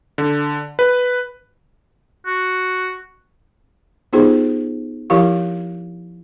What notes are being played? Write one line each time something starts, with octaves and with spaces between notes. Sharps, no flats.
D3
B4
F#4
B3 D#4 F4 G4 G#4 C5
F3 E4 G4 A#4 F5 C#6